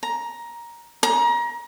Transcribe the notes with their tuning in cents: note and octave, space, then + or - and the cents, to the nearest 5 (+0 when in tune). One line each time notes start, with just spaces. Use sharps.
A#5 +15
A#5 +30